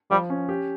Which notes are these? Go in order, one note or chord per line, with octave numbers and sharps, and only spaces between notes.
F3 G3
C#4
G4